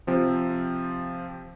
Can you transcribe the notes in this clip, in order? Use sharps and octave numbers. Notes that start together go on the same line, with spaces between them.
C3 F3 C4